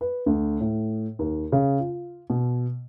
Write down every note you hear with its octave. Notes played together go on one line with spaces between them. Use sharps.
B4
D2
A2
D#2
C#3
F4
B2